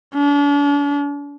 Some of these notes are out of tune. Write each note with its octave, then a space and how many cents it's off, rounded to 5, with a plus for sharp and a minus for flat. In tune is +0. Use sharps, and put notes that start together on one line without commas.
D4 -40